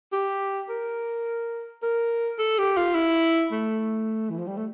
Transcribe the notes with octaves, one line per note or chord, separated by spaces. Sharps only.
G4
A#4
A#4
A4
G4
F4
E4
A3
E3
F3
G3
A3